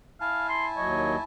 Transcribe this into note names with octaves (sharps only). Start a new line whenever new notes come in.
E4 F5 G#5 A5
C6
D#2 F#3 C#5 D#5